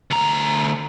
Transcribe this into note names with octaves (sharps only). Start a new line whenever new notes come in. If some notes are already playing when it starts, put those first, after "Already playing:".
D2 A#5